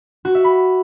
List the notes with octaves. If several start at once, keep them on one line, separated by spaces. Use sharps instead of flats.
F#4
E5
B5